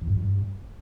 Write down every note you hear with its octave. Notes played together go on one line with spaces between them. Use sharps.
E2
G2
F2
G2